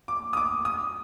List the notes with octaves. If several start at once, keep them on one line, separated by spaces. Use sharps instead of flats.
D6
D#6
D6
D#6